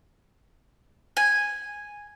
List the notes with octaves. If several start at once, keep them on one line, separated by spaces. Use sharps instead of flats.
G#5